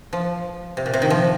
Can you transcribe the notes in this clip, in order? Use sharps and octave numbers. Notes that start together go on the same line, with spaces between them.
F3
C3
A#2
C3
D#3
F3